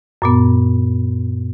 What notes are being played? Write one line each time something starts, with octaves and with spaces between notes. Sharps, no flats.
F#2 A#2 B3